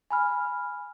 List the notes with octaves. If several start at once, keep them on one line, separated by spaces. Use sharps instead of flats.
G#5 B5 F6